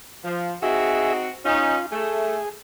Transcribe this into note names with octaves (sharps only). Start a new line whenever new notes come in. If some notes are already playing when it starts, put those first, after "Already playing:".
F3
C4 D#4 F#4 G#4 E5
C#4 D#4 F4
A3 G#4